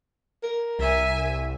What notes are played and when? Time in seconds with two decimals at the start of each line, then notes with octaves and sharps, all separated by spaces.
0.43 A#4
0.79 C2 E5 G#5